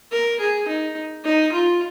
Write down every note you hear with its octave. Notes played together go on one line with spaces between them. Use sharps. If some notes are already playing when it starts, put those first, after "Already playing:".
A#4
G#4
D#4
D#4
F4